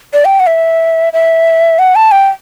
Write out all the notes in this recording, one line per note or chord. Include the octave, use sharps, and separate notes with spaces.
D5
G5
F#5
E5
E5
F#5
A5
G5